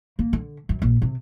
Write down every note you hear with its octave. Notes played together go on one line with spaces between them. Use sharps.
A#3
D3
F#2
A#1
C3